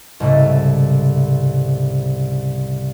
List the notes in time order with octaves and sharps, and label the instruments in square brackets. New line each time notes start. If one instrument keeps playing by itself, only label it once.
[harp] C2 G#2 C#3 A3